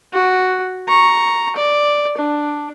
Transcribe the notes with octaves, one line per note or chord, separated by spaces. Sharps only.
F#4
A#5 C#6
D5
D4